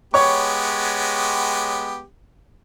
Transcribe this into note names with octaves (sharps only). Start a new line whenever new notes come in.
G#3 B3 G4 C#5 C#6